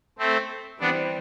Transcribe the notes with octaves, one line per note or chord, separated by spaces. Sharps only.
A3 C4
E3 G3 B3 C4 D4